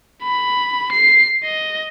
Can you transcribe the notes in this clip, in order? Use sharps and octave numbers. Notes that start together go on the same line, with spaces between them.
B5
C7
D#5